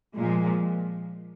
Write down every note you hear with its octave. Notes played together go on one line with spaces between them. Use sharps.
A#2 F3 G#3